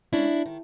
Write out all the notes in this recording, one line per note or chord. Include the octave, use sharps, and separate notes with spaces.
G#3 C#4 D4 E4
D#3